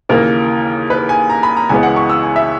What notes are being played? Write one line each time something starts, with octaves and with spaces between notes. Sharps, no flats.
D#2 C#3 E3 A#3 A#4
B4
G#5
A#5
B5
A#5
C#2 C#3 E3 G#3 B3 G#5
F#5
C#6
E6
G#5
E5